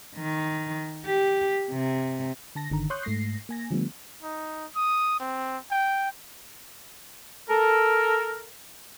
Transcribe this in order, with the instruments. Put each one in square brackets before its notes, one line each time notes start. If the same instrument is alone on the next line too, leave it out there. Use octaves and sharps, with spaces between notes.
[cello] D#3
G4
C3
[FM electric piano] D3 A5 A#6
G1 D3 D#3 A#5
C#5 C6 C#6 D#6 F#6 G6
G#2 A3 A#6 C7
A#3 G#5 A#6
D3 F3 G3 A3 B3
[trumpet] D#4
D#6
C4
G5
[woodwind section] A4 A#4